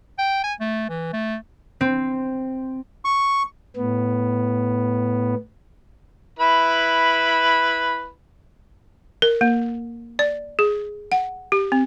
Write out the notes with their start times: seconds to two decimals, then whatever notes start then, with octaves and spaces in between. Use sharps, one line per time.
0.19 G5
0.44 G#5
0.60 A3
0.90 E3
1.13 A3
1.81 C4
3.05 C#6
3.77 A2 B3
6.39 E4 B4
9.22 A#4
9.41 A#3
10.19 D5
10.59 G#4
11.12 F#5
11.52 G4
11.72 C4